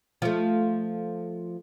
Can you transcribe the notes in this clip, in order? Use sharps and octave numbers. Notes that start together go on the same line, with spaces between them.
F3 A3